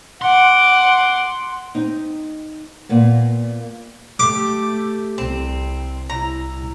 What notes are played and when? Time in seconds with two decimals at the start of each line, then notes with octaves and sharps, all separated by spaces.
0.22 F#5 C6 D6
1.75 C4 D#4
2.89 A#2 A#3 B3
4.19 A3 G4 D6
5.18 C2 C4
6.09 C2 E4 A#5